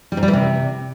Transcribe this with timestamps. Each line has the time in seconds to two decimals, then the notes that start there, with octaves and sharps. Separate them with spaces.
0.12 G3
0.17 G#2
0.23 G3
0.28 E3
0.33 C3